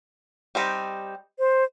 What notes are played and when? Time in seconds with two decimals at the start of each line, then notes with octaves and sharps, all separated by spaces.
0.55 G3 C4 D#4 G4
1.39 C5